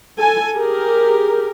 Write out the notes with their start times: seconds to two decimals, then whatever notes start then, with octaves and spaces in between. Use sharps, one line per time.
0.18 A4 G#5
0.55 G4 G#4 A#4